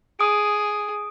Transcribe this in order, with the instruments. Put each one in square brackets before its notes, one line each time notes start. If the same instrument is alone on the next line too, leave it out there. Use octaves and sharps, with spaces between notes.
[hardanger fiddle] G#4 [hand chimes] D#6 D7